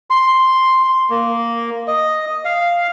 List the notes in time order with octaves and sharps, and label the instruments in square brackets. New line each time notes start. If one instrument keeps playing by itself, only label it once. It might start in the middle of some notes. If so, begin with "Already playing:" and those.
[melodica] C6
A#3
D#5
F5